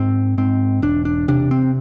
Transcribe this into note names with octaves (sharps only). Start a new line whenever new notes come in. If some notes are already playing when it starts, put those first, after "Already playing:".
Already playing: G#2 C4
G#2 C4
E1 D4
D4
C3 D4
C4